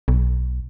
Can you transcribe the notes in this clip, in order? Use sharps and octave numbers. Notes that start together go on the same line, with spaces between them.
B1